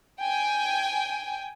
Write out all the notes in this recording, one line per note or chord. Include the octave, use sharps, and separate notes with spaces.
G5 G#5